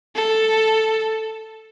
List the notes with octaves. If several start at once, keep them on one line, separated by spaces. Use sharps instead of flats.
A4